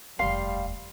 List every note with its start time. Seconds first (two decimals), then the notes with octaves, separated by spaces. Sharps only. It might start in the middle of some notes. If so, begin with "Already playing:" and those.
0.19 F1 D#2 G3 F5 C6